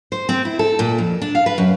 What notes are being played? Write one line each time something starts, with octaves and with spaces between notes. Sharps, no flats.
C5
C4
E4
A4
A#2
F2
D4
F5
B4
F#2